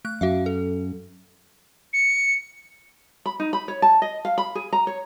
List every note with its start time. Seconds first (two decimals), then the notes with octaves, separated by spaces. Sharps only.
0.05 A3 F#6
0.21 F#2 F#4 E5 F5
0.46 A4
1.93 C#7
3.26 B5
3.40 D#4
3.53 B5
3.68 C#5
3.82 A5
4.02 D#5
4.25 F5
4.38 B5
4.55 G#4
4.73 A#5
4.87 C#5